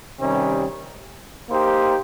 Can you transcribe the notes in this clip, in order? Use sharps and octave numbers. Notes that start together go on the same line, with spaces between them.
C3 D#3 G3 C#4
A#3 D#4 G4 C5